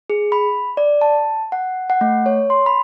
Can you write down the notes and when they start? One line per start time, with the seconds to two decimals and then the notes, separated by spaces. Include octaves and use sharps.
0.10 G#4
0.32 B5
0.77 D5
1.01 A5
1.52 F#5
1.90 F#5
2.01 A3
2.26 C#5
2.50 C6
2.66 B5